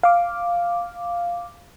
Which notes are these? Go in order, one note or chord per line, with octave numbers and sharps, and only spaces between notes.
F5 D6